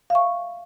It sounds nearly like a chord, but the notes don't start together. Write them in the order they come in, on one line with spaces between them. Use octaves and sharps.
F5 E5 C#6